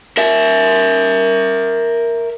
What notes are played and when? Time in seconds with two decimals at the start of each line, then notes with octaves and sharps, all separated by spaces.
0.17 A#4 E5